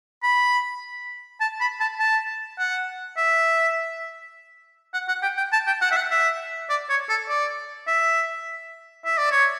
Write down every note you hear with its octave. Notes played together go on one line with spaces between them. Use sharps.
B5
A5
B5
A5
A5
F#5
E5
F#5
F#5
G5
G5
A5
G5
F#5
E5
F#5
E5
D5
C#5
A4
D5
E5
E5
D5
C#5